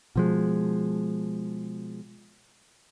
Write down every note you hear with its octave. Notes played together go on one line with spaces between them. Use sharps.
B2 F3 G#3